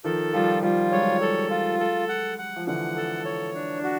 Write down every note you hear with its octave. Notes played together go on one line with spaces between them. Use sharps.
D#3 F3 A4
F3 G3 F4
F3 G3 F4
F#3 G#3 C#5
A4
F4
A4
F#5
F#5
F3
D3 E3 F#5
A4
C#5
D4
F#4